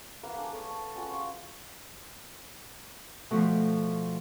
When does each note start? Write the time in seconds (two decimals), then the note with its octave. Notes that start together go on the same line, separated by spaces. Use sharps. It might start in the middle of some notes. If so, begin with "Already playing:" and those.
0.23 A#3 B4 F5 F#5
0.36 A3 D4 G#4
0.51 A4 C#5
0.70 A5
0.95 C#4 F4 F#4 G#4
1.10 F5 C6
3.31 B2 F3 A3